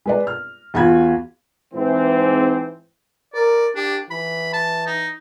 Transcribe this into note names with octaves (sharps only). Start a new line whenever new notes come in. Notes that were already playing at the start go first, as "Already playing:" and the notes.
G#3 B4 D5
F6
E2 F4 F#4 B5 G#6
G#2 E3 C4
A#4 D5
D4 G4
E3 B5
A5
D#4